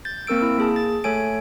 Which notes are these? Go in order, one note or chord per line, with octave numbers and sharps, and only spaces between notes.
G6 A6
A#3 C4 A#4 E6 D7
E4
A#3 G#4 A5
A6
A3 A4 C#5 G#5 D7